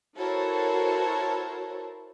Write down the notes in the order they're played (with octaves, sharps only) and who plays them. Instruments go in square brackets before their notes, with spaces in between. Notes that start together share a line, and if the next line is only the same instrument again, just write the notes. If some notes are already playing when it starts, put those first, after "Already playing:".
[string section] E4 F#4 A4 A#4 C5 C#5